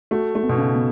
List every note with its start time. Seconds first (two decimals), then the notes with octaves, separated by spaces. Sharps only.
0.11 A3 F#4
0.35 A3
0.43 B3
0.49 B2
0.58 C#3
0.75 B3